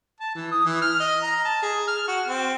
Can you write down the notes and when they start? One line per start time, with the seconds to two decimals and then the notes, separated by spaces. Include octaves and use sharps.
0.20 A5
0.35 E3
0.52 D#6
0.65 E3
0.82 F6
1.00 D#5
1.23 A#5
1.45 A5
1.62 G#4
1.88 F6
2.08 F#4
2.28 C4